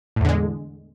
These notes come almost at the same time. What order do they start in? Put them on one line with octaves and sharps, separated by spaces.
A2 E2 D3 G#3